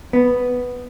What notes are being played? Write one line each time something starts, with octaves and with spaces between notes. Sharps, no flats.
B3